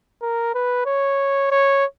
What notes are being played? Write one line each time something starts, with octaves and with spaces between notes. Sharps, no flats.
A#4
B4
C#5
C#5